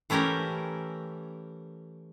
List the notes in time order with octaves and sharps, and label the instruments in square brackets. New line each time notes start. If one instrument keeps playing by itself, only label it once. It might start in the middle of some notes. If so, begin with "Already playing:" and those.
[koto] E3 A3 C#4 G4 A#4